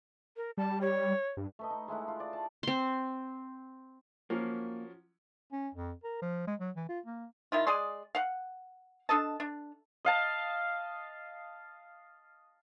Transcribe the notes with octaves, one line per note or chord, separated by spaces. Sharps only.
A#4
G3 A5
C#5
G2
A3 B4 D#5
D#4
G#3 A3 E4 F#5
F4
D5
A5
C4 C6
F3 F#3 A#3 C#4
C#4
F2
A#4
F3
G#3
F#3
E3
F4
A#3
D#3 E4 F4
G#3 G#4 D5 C6
F5 F#5
D4 A4 D#5 A5
D4
D#5 F5 A5